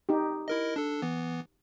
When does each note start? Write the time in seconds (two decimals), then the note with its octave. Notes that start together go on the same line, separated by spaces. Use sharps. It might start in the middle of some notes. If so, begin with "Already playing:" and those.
0.09 D#4 G4
0.48 E4 A#4 D#5
0.76 D4 A4
1.02 E3 B3